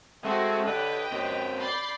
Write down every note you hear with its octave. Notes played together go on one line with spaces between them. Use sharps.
G#3 A3 C4 F#4 A4
D3 G4 B4 C#5 D#5 G5
F#2 C4 B4
D5 B5 G6 A6 C7